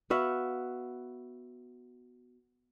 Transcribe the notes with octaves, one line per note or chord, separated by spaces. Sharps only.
B3 F#4 E5 F5